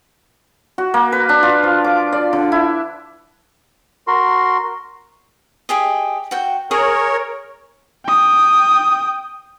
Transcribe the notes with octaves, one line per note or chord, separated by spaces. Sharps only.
F#4
A#3
B4
D4
F4
F3
D6
D5
D3
E4
F#4 A#4 C6
G4 G#4 D#5
F#4 G5
G#4 A#4 C#5
G5 D#6